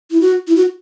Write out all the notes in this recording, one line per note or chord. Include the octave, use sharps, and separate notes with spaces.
E4
F#4
E4
F#4